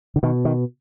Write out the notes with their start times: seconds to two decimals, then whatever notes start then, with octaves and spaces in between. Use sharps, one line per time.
0.16 D3
0.23 B2 D#3
0.45 D#3